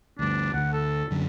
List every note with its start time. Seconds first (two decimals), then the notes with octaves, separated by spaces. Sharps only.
0.19 D2 G2 D4
0.54 D2 F#5
0.73 A4
1.11 F#2 D3